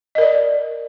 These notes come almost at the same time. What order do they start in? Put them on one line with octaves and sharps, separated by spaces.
D#5 A#4 D5